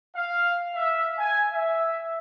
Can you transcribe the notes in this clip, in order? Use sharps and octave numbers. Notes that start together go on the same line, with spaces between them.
F5
E5
G#5
E5